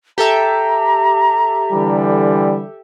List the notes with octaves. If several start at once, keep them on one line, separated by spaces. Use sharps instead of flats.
G4 A4 E5 A#5
D3 E3 G3